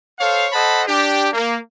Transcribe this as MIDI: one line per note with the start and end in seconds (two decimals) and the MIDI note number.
0.19 0.47 69
0.19 0.47 72
0.19 0.47 73
0.19 0.47 77
0.52 0.82 69
0.52 0.82 72
0.52 0.82 75
0.52 0.82 78
0.52 0.82 81
0.52 0.82 83
0.87 1.28 62
0.87 1.28 67
1.32 1.56 58